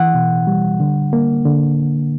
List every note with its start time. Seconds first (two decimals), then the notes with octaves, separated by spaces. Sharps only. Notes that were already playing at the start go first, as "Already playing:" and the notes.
Already playing: E3 F#5
0.14 B2
0.47 G3
0.80 D3
1.13 A#3
1.46 D3